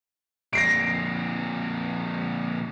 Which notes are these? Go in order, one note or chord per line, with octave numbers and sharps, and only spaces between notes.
F2 A#2 A#6 C7 D7